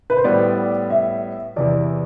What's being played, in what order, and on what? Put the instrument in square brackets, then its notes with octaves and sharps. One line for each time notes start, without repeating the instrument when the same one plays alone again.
[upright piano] B4
C5
[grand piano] A2 G3 B3 [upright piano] D5
[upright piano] E5
[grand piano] E2 C3 E3 [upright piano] D5